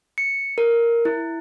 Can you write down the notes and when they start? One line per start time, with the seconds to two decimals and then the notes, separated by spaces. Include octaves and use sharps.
0.18 C#7
0.58 A#4
1.05 E4